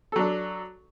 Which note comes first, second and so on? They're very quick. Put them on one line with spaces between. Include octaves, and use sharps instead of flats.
A4 F#3 D4